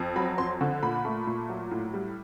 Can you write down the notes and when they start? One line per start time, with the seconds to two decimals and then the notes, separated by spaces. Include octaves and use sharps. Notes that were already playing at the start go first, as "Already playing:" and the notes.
Already playing: F2
0.16 F#3 B5
0.38 F2 C6
0.61 D3
0.83 A#2 B5
1.05 A3
1.27 A#2
1.49 F#3
1.71 A2
1.94 G3